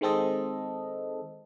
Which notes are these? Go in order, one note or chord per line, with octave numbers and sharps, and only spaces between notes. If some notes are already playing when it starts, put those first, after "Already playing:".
D#3 G#3 C4 A4 D#5